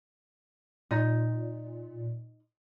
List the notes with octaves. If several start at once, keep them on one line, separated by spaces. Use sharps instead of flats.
A#2 D#4